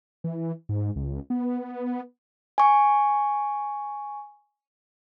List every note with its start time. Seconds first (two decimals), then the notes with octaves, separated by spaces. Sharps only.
0.24 E3
0.69 G#2
0.96 C#2
1.30 B3
2.58 G#5 C#6